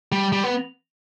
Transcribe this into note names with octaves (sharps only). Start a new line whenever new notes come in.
G3
G3
B3